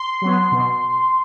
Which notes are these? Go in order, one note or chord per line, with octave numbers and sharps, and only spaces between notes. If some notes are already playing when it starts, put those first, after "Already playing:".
Already playing: C6
F#3 B3
B2